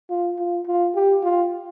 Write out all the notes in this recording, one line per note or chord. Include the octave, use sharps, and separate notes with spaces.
F4
F4
F4
G4
F4